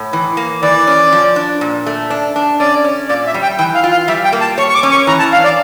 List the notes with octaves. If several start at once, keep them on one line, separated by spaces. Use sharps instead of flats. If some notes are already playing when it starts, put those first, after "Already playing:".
Already playing: A2
E3
A#3
E3 D5
C#4
F3
D4
A#2
A3
D4
D4
C#4 D5
C#4
A#2 D5
E5
G3
G5
E3 G5
F5
F4
F5
G3 E5
G5
A#3
A5
C#5 C#6
C#6
D6
C#4
C#6
E3 A#5
A5
D4 F5
D5